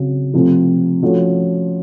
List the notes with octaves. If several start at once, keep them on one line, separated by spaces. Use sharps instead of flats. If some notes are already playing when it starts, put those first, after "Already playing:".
Already playing: C#3 F#3 C4
C3 F3 A3 C4
F3 A3 C#4 F#4